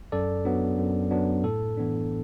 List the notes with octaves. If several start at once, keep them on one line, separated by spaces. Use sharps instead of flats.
F#2 A4 D5
F#3 B3 D4
F#2
F#3 B3 D4
A2 A4
E3 B3 D4